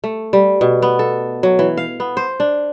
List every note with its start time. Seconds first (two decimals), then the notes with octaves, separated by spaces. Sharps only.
0.04 A3
0.33 G3
0.61 B2
0.82 B3
0.99 A4
1.43 F#3
1.59 E3
1.77 F5
2.00 B3
2.17 C5
2.40 D4